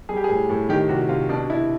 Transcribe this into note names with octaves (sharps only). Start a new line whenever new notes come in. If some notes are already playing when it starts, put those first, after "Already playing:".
G3 G#4
G4
G#4
A2
A2
D#3 G4
C3 F#4
C3 F4
B2 D4
B2 E4